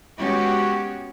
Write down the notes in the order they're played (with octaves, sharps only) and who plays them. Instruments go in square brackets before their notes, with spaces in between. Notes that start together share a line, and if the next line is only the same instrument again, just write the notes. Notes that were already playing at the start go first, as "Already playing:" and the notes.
[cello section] G#3 B3 C#4 F#4 G4